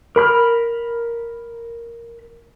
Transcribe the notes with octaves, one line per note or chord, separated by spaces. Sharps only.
A#4 B5 F6